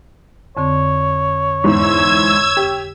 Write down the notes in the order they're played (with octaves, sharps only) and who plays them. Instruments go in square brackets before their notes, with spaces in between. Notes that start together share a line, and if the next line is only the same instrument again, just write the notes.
[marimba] F2 D3 C4 [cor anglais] C#5
[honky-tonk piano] E2 G#2 [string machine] E6 G#6
[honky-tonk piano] G4